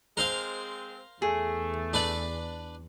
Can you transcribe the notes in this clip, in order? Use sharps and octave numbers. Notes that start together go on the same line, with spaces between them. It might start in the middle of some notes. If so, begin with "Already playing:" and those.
G#3 C4 A#4 C5 F5
E2 A3 G#4
D4 B4 D5